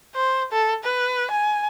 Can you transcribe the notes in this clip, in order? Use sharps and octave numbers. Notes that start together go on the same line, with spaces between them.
C5
A4
B4
G#5